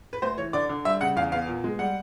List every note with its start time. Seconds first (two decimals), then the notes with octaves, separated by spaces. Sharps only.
0.13 B4
0.22 D2 C5
0.38 E3 C#5
0.53 D3 D5
0.69 D3
0.85 G3 E5
1.00 C#3 F#5
1.16 E2 F5
1.32 B3 F5
1.47 A#2
1.64 G#3
1.79 G3 F#5